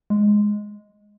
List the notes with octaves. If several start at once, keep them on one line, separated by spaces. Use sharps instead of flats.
G#3